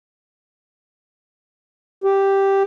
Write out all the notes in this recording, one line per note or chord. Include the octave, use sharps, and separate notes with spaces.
G4